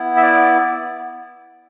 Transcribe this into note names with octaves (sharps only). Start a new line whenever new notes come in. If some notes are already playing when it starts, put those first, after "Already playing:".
Already playing: B3 E4
E5
D5